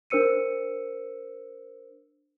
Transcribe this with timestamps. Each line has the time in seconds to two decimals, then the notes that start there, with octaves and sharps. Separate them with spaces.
0.10 D4 A#4 C5 E6 C#7 D#7